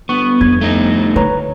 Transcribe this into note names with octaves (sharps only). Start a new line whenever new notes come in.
G1 B3 C#6
F2 G#6
A3 D#4
D3 B4 C#5 A#5